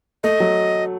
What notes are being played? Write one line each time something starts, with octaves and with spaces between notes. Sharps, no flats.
A3 D#5
F#3